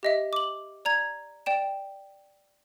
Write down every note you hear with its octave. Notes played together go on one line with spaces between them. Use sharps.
G4 D#5 E5
D6 F#7
D5 A#5 G#6
D5 G5 E7